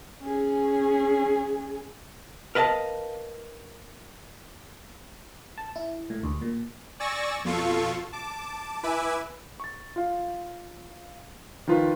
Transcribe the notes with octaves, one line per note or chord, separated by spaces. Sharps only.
C#4 G#4
A#4 B4 D#5 F5 A5
A5
E4
A2
D2
A#2
D5 G#5 C#6 E6 A6 A#6
F2 B2 F4 A4 C#6
A5 D6
E4 B4 E5 G#5 D6 E6
C#6 A6
F4 F5
D#3 F3 F4 B4